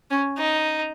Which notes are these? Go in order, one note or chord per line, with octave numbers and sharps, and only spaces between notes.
C#4
D#4